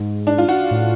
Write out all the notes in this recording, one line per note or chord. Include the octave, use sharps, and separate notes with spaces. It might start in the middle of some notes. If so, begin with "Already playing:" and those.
Already playing: G#2
D4
F4
F#4
A2